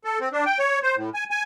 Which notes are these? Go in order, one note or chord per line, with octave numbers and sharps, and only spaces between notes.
A4
C4
D4
G5
C#5
C5
A2
G#5
G#5